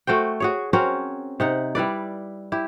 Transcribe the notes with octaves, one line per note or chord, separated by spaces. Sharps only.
A3 F#4 C5 G5
F#4 G#4 C#5
C4 C#4 F#4 A#4
C3 D#4 F#5
G3 E4 B4 D5
E4 G4